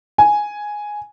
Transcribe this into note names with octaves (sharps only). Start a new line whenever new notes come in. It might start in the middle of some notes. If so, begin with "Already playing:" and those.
G#5